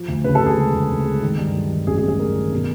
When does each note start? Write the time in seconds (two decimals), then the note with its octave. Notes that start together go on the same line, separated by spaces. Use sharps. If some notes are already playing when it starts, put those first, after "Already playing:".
Already playing: F3
0.08 D2
0.24 C#3 B4
0.35 A4
0.41 C#3
0.46 G#4
0.57 G#3
0.74 D2
0.90 D2
1.06 G#3
1.22 D#3
1.38 G2
1.55 F#3
1.71 D#3
1.87 A1 G#4
1.98 G#4
2.03 G2
2.08 G#4
2.19 G2 A#4
2.35 D#3
2.52 B2